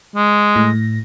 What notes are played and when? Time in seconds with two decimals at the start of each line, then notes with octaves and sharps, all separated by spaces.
0.16 G#3
0.56 A2 A#6